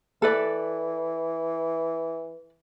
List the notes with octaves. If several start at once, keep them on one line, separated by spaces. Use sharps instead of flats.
E3 A4 B4 D5